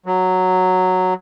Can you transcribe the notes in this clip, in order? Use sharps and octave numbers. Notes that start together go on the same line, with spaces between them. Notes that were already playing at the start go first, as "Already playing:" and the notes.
F#3